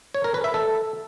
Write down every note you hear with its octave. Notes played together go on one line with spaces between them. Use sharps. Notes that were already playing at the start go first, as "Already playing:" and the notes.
C#5
A#4
B4
E5
A4